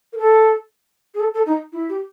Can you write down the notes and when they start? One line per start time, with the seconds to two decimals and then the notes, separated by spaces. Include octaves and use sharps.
0.13 A#4
0.18 A4
1.14 G#4
1.20 A4
1.34 A4
1.46 D#4
1.72 E4
1.89 G4